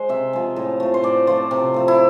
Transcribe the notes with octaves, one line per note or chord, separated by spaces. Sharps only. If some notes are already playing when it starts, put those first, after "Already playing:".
Already playing: G#3 C5
C3 E5
F3 G#3
A2
F3 A3
C5
A2 D5
F3 A3 C5
C3
F3 A3
E4